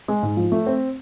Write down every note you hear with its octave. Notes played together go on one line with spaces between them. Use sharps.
G#3
G#2
F3
A3
C4